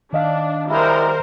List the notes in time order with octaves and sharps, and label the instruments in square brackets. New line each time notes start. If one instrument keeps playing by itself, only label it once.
[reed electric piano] D#3 D#5 F5 [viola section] D4
[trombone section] G3 G#3 E4 [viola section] A#4 C5